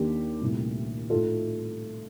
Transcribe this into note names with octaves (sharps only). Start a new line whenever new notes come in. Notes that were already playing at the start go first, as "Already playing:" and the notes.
Already playing: D#2 D#3 A#3 D4 G4
C2 A#2 A3
A2 A3 D#4 F4 A4